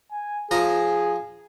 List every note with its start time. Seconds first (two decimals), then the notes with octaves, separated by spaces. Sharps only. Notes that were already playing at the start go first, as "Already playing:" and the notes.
0.12 G#5
0.51 F3 G#4 A#5 D#6